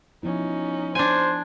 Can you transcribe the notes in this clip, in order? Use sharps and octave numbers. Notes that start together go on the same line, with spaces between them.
F3 B3 C#4 D#4 E4
D4 C5 G#5